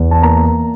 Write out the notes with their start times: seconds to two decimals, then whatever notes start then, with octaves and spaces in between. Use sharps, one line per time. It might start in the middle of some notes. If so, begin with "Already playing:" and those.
Already playing: E2
0.11 A5
0.22 A#3 A#5